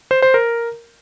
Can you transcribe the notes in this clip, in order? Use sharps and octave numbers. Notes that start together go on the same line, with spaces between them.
C5
C5
A#4